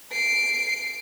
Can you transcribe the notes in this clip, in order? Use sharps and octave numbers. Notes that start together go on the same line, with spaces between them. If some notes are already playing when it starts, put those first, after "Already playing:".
C7 D7